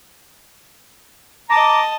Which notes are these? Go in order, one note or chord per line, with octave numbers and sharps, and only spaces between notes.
D#5 A5 A#5 D6